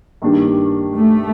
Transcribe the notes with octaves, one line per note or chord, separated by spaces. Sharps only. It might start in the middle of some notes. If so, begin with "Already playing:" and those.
G2 D#3 A#3 D4 G4
A3